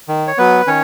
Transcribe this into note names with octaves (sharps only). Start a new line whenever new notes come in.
D#3
C#5
F#3 B3 B4
D#3 C#4 C#5